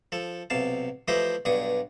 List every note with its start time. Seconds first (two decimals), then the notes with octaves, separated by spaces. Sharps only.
0.12 F3 A4
0.50 B1 C3 F5 A5
1.08 E3 F3 A3 G4 C5 D#5
1.45 B1 G2 D4 C#6 D#6